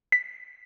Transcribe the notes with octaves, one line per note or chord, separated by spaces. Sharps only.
B6